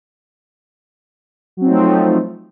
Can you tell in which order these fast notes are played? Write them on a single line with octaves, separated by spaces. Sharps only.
F#3 C4 D#4 A3 F3